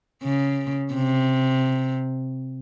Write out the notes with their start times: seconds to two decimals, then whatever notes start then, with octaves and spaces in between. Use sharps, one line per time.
0.23 C#3
0.94 C3